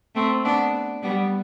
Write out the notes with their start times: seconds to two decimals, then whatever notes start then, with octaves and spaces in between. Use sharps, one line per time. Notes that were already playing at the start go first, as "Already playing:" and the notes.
0.15 A3 C4
0.45 B3 D4
1.02 G3 B3